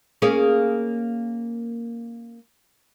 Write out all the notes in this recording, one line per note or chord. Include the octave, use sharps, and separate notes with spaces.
A#3 C#4 G#4